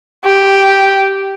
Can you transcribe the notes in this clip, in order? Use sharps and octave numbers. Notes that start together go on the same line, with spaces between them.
G4